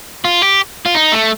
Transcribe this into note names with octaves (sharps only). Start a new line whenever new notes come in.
F4
G4
F4
D#4
A3